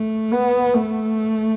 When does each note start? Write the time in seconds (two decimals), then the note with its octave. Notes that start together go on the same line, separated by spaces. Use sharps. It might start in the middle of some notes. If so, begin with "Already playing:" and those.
Already playing: A3
0.32 B3
0.74 A3